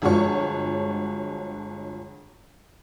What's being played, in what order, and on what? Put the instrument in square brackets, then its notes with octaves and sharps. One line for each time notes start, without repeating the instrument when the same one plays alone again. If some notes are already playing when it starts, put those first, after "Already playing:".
[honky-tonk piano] G1 F3 G#3 F#4 C#5 C#6